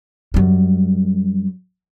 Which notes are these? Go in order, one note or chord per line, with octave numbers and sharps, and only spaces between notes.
F#2 G3